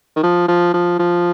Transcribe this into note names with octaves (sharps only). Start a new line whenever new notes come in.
D#3
F3
F3
F3
F3